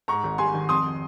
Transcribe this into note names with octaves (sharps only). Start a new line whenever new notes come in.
G#2 A#5 C#6
G#1
G3 G#5 C6
D#3
F2 C6 D#6